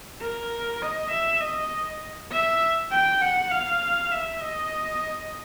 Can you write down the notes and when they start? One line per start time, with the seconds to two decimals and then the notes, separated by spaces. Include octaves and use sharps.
0.21 A#4
0.82 D#5
1.12 E5
1.41 D#5
2.31 E5
2.91 G5
3.21 F#5
3.51 F5
4.11 E5
4.41 D#5